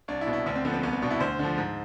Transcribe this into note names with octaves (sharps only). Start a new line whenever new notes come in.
C2 D4
E4
B2
E4
D2 D4
C4
D3 F3 B3
C4
C2 B3
C4
B2 D4
E4
D2 C5
D3 F3
G#2